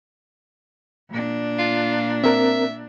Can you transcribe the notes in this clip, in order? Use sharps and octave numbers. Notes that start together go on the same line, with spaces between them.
A#2 D4
F4
C4 A#4 E5